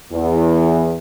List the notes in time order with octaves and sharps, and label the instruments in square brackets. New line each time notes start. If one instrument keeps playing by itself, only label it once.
[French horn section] E2